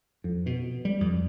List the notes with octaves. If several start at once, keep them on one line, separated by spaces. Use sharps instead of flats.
F2
B2
G3
F2